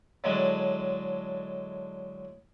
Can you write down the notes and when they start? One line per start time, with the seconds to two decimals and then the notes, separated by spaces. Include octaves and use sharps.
0.24 A2 D3 F#3 G#3